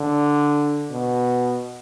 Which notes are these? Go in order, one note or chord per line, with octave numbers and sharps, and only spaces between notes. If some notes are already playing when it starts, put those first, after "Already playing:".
Already playing: D3
B2